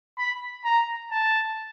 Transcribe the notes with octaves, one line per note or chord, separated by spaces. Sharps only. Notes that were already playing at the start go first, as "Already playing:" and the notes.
B5
A#5
A5